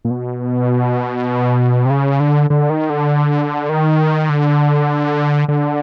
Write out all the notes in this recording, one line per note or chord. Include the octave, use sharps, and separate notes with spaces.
A#2
B2
C3
C#3
D3
D3
D#3
D3
D#3
D3
D3